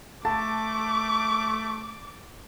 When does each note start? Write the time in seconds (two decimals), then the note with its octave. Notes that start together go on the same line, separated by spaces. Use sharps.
0.25 A3 A5 D6